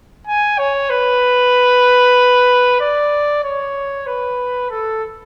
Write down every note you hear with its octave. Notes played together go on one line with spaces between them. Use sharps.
G#5
C#5
B4
D5
C#5
B4
A4